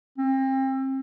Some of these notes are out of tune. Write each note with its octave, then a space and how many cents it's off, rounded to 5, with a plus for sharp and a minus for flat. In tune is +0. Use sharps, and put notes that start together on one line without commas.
C4 +35